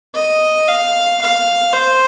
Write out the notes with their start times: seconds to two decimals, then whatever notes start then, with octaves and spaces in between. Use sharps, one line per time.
0.14 D#5
0.68 F5
1.21 F5
1.73 C5